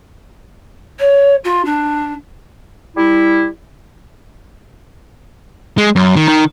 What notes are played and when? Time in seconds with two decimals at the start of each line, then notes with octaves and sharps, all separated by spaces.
0.99 C#5
1.44 F4
1.65 D4
2.97 G3 E4
5.78 G#3
5.96 F#2
6.16 D#3
6.28 D#3